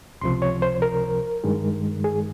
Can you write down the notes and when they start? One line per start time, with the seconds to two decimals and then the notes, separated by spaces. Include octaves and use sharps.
0.21 C#2 C3 F3 C6
0.42 C#5
0.62 C5
0.82 A#4
1.44 G2 D#3 G#3
2.04 G#4